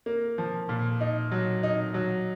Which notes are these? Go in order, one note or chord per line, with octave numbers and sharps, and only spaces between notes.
A#3
F3
A#2
D#4
F#3
D#4
F#3